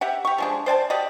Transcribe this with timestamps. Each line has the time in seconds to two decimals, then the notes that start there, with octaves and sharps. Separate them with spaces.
0.01 G4 E5 F#5
0.25 G4 C#6
0.38 F3 G#3 D4
0.66 C5 D5 G#5 A5
0.90 F#4 G4 D5 D#5